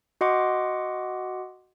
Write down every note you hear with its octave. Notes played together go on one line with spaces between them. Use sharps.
F#4 D#5 F#5 C6 D6